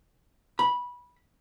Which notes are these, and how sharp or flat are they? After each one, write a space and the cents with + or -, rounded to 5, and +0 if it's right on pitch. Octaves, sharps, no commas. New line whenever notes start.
B5 -15